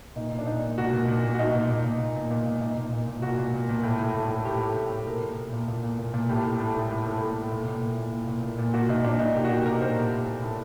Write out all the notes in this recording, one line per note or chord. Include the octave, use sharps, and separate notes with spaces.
A#2 D#4
A#2
D4
A#2 D#4
A#2
A#2 F#4
A#2
A#2
A#2
F#4
A#2 D#4
A#2
A#2
A#2
A#2
A#2
A#2
A#2
A#2 D#4
A#2
A#2
A#2
A#2 F#4
A#2
A#2
A#2
A2
A2
A2
A2
A2 G4
A2
A2
A2
A#2 A#4
A#2
A#2
A#2
A#2
A#2
A#2
A#2
A2 G4
A2
A2
A2
A2
A2
A2
A2
A#2
A#2
A#2
A#2
A#2
A#2
A#2
A#2
A#2 F#4
A#2 D#4
A#2 D4
A#2 D#4
A#2 G4
F#4
A#2 G4
A#2 A#4
A#2 C5
A2 G4
A2
A2
A2